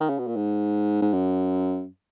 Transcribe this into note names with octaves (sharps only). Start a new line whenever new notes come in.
D#3
C#3
B2
A#2
G#2
G#2
F#2